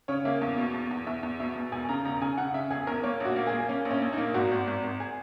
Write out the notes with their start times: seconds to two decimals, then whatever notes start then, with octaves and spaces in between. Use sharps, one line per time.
0.08 C#3 C#5
0.25 A#3 E5
0.41 E2
0.58 B2
0.74 E2
0.91 E2
1.07 E2 E5
1.23 E2
1.39 B2 E5
1.56 B2
1.72 E1 G#5
1.89 C#3 A#5
2.05 E1 A#5
2.21 C#3 G#5
2.38 C#3 F#5
2.54 C#3 E5
2.71 E1 G#4
2.87 E2 A#4
3.03 A#3 C#5
3.20 A#1 F#4
3.36 A#3
3.47 G#4
3.53 A#3
3.69 A#3 C#4
3.85 A#1
3.91 C#4
4.02 A#1
4.13 D#4
4.18 A#3
4.34 G#1 F#4
4.51 G#1
4.67 G#1
4.84 G#1
5.00 G#4